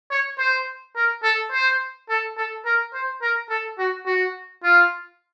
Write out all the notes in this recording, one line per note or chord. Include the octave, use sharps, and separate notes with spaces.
C#5
C5
A#4
A4
C5
A4
A4
A#4
C5
A#4
A4
F#4
F#4
F4